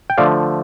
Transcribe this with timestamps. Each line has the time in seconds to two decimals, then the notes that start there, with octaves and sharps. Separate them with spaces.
0.10 G5
0.18 D3 F3 A3 D5 F5